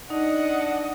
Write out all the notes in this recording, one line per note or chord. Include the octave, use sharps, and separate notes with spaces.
D4 D#4 D#5 F#5